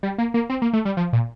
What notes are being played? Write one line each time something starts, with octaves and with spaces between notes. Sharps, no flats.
G3
A#3
A#3
C4
A#3
A3
G3
F3
A#2